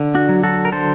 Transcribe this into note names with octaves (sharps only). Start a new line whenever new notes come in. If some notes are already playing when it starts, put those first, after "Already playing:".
Already playing: D3
D4 F#4
F#3
F#4 A4
A#4
D3 A4 C5